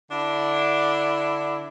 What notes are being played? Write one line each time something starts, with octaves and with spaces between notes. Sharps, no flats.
D3 D4 E4